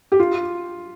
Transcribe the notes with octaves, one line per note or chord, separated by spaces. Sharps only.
G4
F4